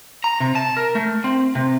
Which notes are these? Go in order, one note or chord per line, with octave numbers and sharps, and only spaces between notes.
A#5
C3
A5
A#4
A3
C4
C3